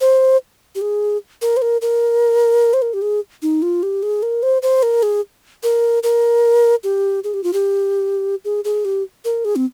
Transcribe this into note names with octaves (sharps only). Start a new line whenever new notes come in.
C5
G4
G#4
A#4
C5
A#4
A#4
C5
A#4
G4
G#4
D#4
F4
G4
G#4
A#4
C5
C5
A#4
G#4
A#4
A#4
G4
G#4
G4
F4
G4
G#4
G#4
G4
A#4
G#4
C4